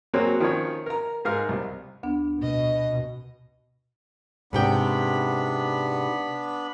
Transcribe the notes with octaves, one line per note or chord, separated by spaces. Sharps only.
F#3 A#3 C4 F#4 G#4 C#5
D#3 F3 C#4 C#5
A#4 A#5
G#2 G#4 A#4 F5 F6
C2
D2 B3 D4
B2 D#5
G#2 C3 B3 D4 G5 B5